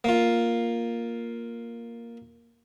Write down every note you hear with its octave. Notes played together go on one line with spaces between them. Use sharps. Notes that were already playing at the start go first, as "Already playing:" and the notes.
A#3 F4